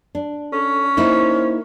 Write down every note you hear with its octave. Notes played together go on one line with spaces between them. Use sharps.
D4
C#4 A4
A#3 D#4 E4 C5